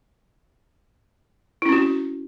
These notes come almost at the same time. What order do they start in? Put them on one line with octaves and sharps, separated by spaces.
E4 C#4 C4 F#4